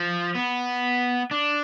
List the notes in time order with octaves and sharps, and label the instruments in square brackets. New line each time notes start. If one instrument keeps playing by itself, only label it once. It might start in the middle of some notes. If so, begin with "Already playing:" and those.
Already playing: [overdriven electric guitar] F3
B3
D4